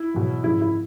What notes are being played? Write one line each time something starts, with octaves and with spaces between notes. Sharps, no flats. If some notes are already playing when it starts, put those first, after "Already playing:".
Already playing: E4
E2 B2 F#3
G#1 F#2 C#3 F3 G#3 E4
E4